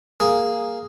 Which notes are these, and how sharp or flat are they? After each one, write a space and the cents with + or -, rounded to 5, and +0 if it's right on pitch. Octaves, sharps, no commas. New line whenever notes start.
A#3 +0 G#4 -5